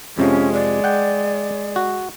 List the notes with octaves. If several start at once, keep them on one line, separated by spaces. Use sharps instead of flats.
F2 C3 F3 G#3 C#4
D5
F#5 G5
F#4